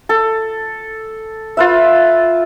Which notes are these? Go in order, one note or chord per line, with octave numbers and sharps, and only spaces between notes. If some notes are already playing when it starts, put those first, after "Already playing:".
A4
F4 B4 E5